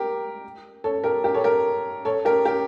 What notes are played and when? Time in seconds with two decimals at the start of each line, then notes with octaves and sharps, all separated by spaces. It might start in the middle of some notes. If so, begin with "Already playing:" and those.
Already playing: G4 A#4
0.84 A4 C#5
1.04 G4 A#4
1.24 G4 A#4
1.34 A4 C#5
1.44 G4 A#4
2.05 A4 C#5
2.25 G4 A#4
2.45 G4 A#4